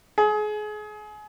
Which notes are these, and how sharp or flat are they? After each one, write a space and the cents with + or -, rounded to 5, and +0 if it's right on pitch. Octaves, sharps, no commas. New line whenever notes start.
G#4 +30